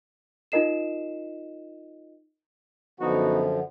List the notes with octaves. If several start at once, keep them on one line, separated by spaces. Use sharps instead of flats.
D#4 F4 A#4 D#5 C7 E7
F#2 D3 F3 B3 D#4 F#4